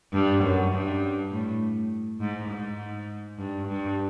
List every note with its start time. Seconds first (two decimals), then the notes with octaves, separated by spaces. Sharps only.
0.13 G2
0.43 F#2
0.72 G2
1.31 A2
2.20 G#2
2.49 G#2
3.38 G2
3.67 G2